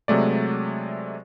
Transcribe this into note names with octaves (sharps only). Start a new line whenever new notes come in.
C3 F#3 G#3 A3 D5